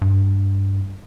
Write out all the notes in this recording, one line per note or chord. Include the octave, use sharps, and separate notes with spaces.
G2